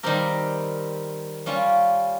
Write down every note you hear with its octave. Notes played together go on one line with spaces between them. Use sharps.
D#3 G3 C4 G4 A#4
G3 C#4 F4